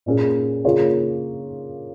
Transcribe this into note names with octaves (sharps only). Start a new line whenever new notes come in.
A#2 A#3 C#4 G#4
C#3 A#3 F4 G#4 C#5